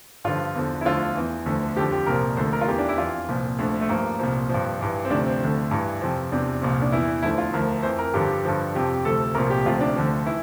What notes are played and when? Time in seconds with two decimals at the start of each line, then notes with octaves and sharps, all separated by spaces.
0.25 G2 D3 F3 F4
0.55 E2 D3 F3
0.81 E4
0.85 D2 D3 F3 F4
1.15 E2 E3
1.46 D2 D3 F3
1.76 F2 D3 F3 G4
1.92 G4
2.06 C2 A#2 F3 A#4
2.37 D2 D3 F3 C5
2.53 A#4
2.61 F4
2.67 E2 E3 G4
2.78 D4
2.89 E4
2.98 F2 E3 F4
3.28 C2 A#2 F3
3.59 D2 D3 F3
3.81 A3
3.89 G2 F3 A#3
4.19 C2 A#2 F3
4.49 G2 F3
4.79 G2 E3
5.05 C4
5.10 D2 C3 F3 D4
5.26 C4
5.41 D2 D3 F3
5.71 G2 E3
6.02 F2 C3 F3
6.32 E2 C3 F3 D4
6.62 C2 A#2 F3
6.82 D4
6.92 E2 E3 E4
7.23 D2 D3 F3 E4
7.38 F4
7.53 D2 D3 F3 A#4
7.83 F2 E3 C5
7.99 A#4
8.14 G2 D3 F3 G4
8.45 G2 D3 F3
8.74 F2 C3 F3 G4
9.05 D2 C3 F3 A4
9.35 C2 A#4
9.37 A#2 F3
9.50 G4
9.65 D2 C3 F3 F4
9.81 D4
9.96 D2 D3 F3 C4
10.26 E3 E4